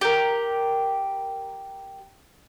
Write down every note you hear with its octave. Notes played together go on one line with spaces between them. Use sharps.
G4 A#4